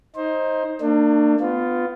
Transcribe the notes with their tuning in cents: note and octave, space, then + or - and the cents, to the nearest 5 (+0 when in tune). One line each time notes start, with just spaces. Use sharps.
D#4 +15 C5 +20
A#3 -40 D4 +30
B3 +25 F4 +0